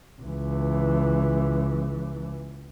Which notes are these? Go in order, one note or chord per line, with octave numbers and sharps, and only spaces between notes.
C#2 E3